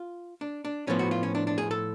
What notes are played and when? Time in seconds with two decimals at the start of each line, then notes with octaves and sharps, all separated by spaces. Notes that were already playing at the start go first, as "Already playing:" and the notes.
Already playing: F4
0.41 D4
0.65 D4
0.87 A2 F3 B3 C#4
0.99 F#4
1.11 F4
1.23 C#4
1.35 D4
1.47 D4
1.58 G#4
1.71 A4